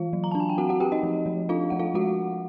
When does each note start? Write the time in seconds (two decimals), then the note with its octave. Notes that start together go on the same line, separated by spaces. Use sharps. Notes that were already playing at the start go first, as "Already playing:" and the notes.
Already playing: E3 F4 F5
0.13 F#3
0.24 A#5
0.31 D4 A5
0.40 G#5
0.50 G5
0.58 C4 F#4 F#5
0.69 F#4 F#5
0.80 C4 G4 G5
0.92 D#4 D#5
1.03 F3
1.26 F3
1.49 D4 F4 F5
1.70 F3 F#5
1.79 F4 F5
1.94 G#3 F#4 F#5